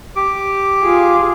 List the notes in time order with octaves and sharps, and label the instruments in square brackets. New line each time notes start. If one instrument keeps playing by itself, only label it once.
[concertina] G4 D6
[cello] F4 G#4